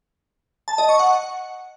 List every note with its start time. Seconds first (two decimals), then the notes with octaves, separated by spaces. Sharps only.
0.68 A5
0.78 D#5
0.89 C#6
0.99 F#5